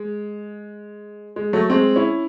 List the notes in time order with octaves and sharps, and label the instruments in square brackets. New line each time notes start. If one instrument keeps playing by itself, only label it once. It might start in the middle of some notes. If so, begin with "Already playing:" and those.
Already playing: [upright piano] G#3
G#3
F#3 A3
G#3 C4
C#4 E4